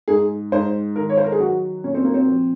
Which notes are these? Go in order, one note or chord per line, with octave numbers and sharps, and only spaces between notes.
G#2 G#4
G#2 C5
D#3 A#4
C#5
C5
A#4
G#4
F#3 F#4
A#2 C#4
C4
A#3
C4
F3